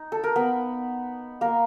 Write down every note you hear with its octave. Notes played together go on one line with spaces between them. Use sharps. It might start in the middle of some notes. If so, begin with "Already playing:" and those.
Already playing: D#4
A4
A#4
B3 B4
A#3 A#4